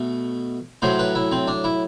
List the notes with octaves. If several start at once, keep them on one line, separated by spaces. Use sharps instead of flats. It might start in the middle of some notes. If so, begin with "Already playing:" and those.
Already playing: B2 A3
A2 F#3 A3 C5
B4
E4
C4
D4
E4